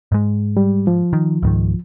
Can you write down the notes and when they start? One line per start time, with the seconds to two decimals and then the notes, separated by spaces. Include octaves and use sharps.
0.12 G#2 G#3
0.57 G3
0.87 F3
1.13 D#3
1.43 C#2 G#2 D#3